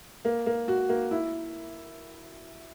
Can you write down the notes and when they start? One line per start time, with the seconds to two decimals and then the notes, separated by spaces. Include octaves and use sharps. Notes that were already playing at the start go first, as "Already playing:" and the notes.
0.25 A#3
0.46 A#3
0.68 F#4
0.89 A#3
1.11 E4